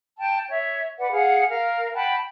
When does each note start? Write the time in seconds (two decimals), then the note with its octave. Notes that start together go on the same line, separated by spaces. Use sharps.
0.17 G5 A5
0.49 C#5 E5
0.99 B4 D5 F#5
1.12 G#4 F5 F#5
1.49 A#4 F5
1.94 F#5 G5 A5 B5